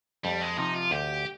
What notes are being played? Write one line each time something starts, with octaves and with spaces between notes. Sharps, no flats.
F2 G3
G#3
C3 F3 D#4
F4
D2 G4